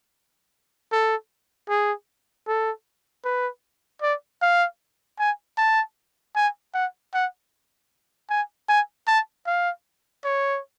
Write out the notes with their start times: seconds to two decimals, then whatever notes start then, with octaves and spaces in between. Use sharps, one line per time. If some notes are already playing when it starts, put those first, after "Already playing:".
0.92 A4
1.69 G#4
2.47 A4
3.24 B4
4.02 D5
4.42 F5
5.19 G#5
5.57 A5
6.36 G#5
6.74 F#5
7.14 F#5
8.29 G#5
8.69 G#5
9.07 A5
9.46 F5
10.24 C#5